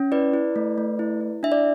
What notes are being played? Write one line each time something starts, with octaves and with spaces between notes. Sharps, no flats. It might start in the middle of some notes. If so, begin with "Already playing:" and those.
Already playing: C#4
E4 B4 D5
E4
A3
A3
E4
E4
D4 E5
D5